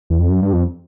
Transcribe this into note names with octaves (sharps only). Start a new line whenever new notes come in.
E2
F2
F#2
G2
F2